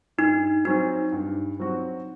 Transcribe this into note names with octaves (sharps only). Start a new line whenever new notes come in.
G2 D#4
F#3 C4 D#4 F#4
G2
F#3 C4 F#4